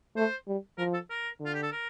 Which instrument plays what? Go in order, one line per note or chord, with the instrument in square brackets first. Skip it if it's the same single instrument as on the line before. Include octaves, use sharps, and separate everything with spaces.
[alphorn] A3 [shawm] C5
[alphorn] G3
[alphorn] F3 [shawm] A#4
[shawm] A4
A#4
[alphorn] D3
[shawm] F4
G4
A4
A#4